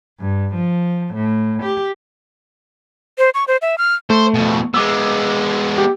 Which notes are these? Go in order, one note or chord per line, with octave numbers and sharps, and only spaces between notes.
G2
F3
A2
G4
C5
C#6
C5
E5
F6
A3 C5
F2 B2
G#3 B3 D6 E6
G4